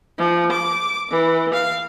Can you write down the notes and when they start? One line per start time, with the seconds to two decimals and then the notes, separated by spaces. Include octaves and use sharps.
0.18 F3
0.52 D6
1.11 E3
1.53 F5